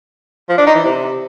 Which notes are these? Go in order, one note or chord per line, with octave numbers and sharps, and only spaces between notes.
F3
D4
D#4
E3
C3